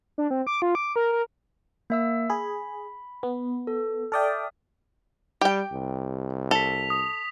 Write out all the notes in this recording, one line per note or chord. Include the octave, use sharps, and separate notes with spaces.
D4
C4
D6
F4
D6
A#4
A#4
A#3 E5 E6
G#4 B5
B3
A4
A4 D5 E5 G5 D#6 F6
G3 G4 G5
C2
A4 B6 F7
D#6